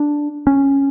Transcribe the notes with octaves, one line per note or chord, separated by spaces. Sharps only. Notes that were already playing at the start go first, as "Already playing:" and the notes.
Already playing: D4
C#4